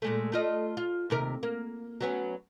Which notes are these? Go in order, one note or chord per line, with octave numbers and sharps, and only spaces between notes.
A#2 G#3 A3
A3 F4 D#5
F4
D#2 C3 A#4
A#3
F#3 B3 C#4